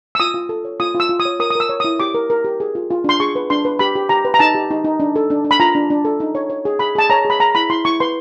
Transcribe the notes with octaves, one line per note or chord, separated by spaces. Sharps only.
E6
F4 D#6
F4
A4
C#5
F4 D#6
F4 E6
F4
D#6
C#5
A#4 D#6
D#6
A#4 E6
C#5
D#6
E4
G4 D6
A#4
A#4
G4
G#4
F4
F4
D4 C6
G#4 C#6
B4
D4 C6
B4
G4 B5
G4
G4 A#5
B4
A#5
D#4 A5
G4
D#4
D#4
D4
A4
D4
D4
B5
F4 A#5
D4
D4
A4
D#4
C#5
C#5
G#4
G#4 B5
G#4 A5
C#5 A#5
G#4
B5
G#4 A#5
E4 B5
E4 C6
E4 C#6
B4 C6